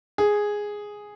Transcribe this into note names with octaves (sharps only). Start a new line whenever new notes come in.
G#4